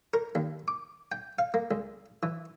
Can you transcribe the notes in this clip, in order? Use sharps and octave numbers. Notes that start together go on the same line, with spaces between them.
A#4
D#2
D6
G5
F5
A#3
C#2
E3